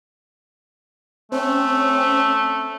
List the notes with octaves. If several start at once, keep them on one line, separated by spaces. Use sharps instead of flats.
A3 C4 C#4